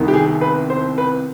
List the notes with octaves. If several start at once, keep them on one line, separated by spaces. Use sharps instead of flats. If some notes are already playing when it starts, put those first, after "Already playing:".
Already playing: C2 C3 D#3 B3
G4
G#4
B4
C5
B4